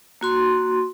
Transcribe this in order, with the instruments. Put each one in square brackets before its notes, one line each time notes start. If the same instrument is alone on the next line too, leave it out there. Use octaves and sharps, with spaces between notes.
[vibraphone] A#3 F#4 C6